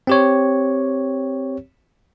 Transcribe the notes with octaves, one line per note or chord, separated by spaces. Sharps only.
C4 G4 C#5